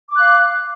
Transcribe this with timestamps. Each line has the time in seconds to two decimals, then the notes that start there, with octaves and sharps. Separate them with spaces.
0.09 D6
0.14 F#6
0.19 F5